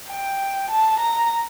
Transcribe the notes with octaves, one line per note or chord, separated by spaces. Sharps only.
G5
A5
A#5